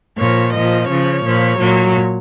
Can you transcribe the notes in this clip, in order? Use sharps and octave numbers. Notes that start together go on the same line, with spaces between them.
A#2 F3 C#5
A#2 F3 D#5
C#3 F3 C#5
A#2 F3
A#2 F#3